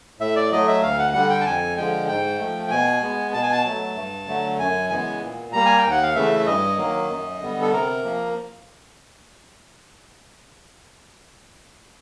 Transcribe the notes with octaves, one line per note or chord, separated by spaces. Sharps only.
A2 E5
D5
F#3 A3 D#5
E5
D2 F5
F#5
D3 G3 F#5
G5
A5
F2 G#5
D3 F3 G#3 G5
G#2 G5
F3 A3
G5
B2 G#5
G#3 B3
B2 A5
G#5
A5
F#3 A3
G2
D3 F#3 A3
F#2 G#5
C#3 E3 G#3 B3 G#5
A#2
G3 A#3 A#5
G#5
G5
D#2
F#5
F5
C#3 E3 A3 E5
E5
G2 D#5
D#3 F#3 A#3
F#2
D3 G3 B3
A4
C3 A#4
F3 A#3